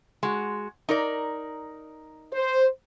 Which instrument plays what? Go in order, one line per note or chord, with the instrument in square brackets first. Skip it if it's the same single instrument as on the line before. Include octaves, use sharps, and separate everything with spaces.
[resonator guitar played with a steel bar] G#3 F#4
D#4 A#4 D5
[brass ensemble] C5